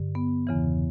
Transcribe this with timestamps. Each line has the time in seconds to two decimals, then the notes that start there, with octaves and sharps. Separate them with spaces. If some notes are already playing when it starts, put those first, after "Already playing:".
Already playing: G2 D3
0.15 B3
0.47 E2 C#3 E3